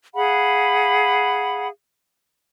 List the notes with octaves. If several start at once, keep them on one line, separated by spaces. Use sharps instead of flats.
G#4 F5 F#5 B5